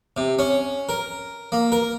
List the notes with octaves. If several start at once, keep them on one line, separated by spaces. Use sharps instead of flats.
C3
C#4
A#4
A#3
A#4